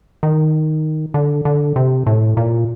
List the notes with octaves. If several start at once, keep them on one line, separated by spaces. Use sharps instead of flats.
D#3
D3
D3
C3
A2
A#2